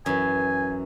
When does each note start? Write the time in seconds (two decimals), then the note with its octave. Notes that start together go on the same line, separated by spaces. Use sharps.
0.06 F#2 E3 G#5